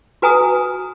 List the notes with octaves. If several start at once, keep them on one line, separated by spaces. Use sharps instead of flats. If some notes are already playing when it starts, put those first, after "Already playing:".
F#4 B4 G#5 A#5 D#6